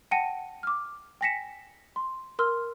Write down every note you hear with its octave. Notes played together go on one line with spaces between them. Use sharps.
F#5 G5 A5 A#6 C#7 D#7
D6 F6
G5 G#5 A#6 B6 C#7 E7
C6
A#4 C6 E6 F6